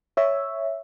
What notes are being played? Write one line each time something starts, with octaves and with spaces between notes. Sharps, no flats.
C#5 E5